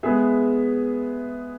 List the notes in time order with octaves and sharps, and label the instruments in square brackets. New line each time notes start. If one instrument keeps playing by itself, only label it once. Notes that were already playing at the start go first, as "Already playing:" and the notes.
[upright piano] G#3 B3 G#4 E5